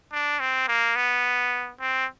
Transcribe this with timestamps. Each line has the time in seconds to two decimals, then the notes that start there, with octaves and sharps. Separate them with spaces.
0.12 D4
0.40 C4
0.68 A#3
0.96 B3
1.80 C4